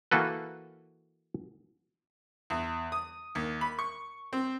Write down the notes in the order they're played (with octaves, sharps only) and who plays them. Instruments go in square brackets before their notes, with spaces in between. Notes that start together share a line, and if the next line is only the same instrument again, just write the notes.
[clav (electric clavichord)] E3 A#3 F#4 A4 B4
[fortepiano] E2
D#6
D#2
B5
C#6
C4